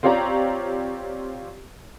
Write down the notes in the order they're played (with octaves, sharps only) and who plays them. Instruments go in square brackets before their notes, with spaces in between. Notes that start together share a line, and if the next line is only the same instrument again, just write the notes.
[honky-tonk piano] C4 F4 G4 C#5 D5 A#5